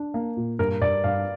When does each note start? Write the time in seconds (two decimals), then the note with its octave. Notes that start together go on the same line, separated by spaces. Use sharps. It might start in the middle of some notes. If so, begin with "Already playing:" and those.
Already playing: D4
0.14 A#3
0.37 A#2
0.59 G2 A#4
0.81 G2 D5
1.04 G2 F5